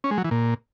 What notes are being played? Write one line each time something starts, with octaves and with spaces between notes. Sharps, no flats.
C#4
G#3
F#3
E3
A#2